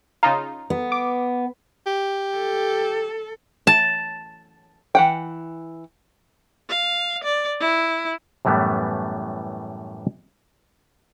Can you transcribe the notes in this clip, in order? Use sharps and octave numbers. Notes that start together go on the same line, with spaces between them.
C#3 D#4 F4 A#5
B3
D6
G4
A4
A5
E3 F#5 G5
F5
D5
E4
F#2 A2 E3 G3 A3 B3